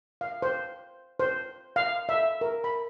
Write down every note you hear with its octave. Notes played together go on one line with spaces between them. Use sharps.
F5
C5
C5
F5
E5
A#4
B5